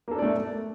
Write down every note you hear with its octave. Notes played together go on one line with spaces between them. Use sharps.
A3 A#3 D4 A4 D5